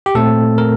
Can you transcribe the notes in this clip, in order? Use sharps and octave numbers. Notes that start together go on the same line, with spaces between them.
G4
A#2 A3 C4 A4
A#4